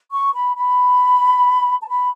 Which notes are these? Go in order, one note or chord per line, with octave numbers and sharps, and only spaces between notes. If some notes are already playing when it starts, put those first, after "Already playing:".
C#6
B5
B5
A5
B5